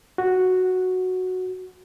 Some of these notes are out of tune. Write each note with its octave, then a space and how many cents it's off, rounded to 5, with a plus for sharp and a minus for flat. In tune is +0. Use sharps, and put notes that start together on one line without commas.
F#4 -5